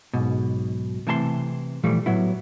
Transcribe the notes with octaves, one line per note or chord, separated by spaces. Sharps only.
B1 G#2 B2
C3 E3 A3 A5 A#5 C6
A#2 E3 F3 G3 A3
A2 F#3 B3 E4